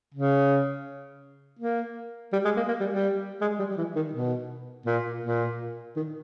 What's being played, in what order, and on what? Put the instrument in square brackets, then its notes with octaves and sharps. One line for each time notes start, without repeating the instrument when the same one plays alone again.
[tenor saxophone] C#3
A#3
G3
G#3
A#3
A#3
G3
G3
G#3
G3
G3
E3
D#3
B2
A#2
A#2
D#3